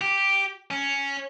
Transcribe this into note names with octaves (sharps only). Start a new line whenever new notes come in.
G4
C#4